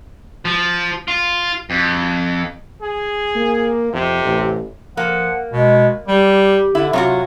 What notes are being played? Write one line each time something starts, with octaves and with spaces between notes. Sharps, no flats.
F3
F4
F2
G#4
A#3
F2 C3
A1
F3 A#3 F#5
B2 G#3
G3 G4
D3 E4
C3 F#3 F4 F#4